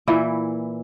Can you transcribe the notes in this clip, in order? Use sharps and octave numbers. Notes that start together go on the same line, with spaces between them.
A#2 E3 E4